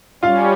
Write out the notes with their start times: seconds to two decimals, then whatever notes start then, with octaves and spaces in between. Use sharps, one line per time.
0.23 G3 C#4 F4 F5